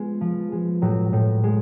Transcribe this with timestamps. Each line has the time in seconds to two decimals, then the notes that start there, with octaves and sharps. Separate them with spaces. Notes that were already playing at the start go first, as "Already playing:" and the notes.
Already playing: G#3 B3 F4
0.21 F3
0.52 G#3
0.82 A2 F#3 F#4
1.13 A2
1.44 G#3